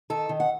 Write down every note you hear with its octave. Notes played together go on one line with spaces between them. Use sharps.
D#3 A4
D#3
F#5